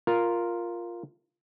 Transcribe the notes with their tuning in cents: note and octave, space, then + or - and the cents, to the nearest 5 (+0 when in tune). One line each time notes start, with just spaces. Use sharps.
F4 +0 A#4 +0